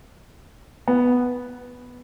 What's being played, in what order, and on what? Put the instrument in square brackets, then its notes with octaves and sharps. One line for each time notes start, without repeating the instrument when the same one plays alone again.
[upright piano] B3